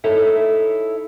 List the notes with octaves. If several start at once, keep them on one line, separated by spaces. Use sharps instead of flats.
D#4 E4 A4 C#5 E5